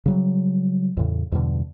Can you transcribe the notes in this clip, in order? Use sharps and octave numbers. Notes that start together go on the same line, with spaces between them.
C#3 F#3 G3
E2 A2 C#3
E2 G2 B2 D3